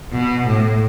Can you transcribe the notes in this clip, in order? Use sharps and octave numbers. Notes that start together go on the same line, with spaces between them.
B2
A2